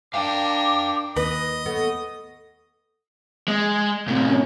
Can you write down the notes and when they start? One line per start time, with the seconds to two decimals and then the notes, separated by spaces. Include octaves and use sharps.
0.14 D4 A#4 F5 G5 D6
1.16 D#2 B4 D#5
1.66 A3 B3
3.48 G#3
4.08 A2 C3
4.27 C#4